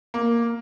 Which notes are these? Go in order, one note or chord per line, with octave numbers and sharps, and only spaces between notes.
A#3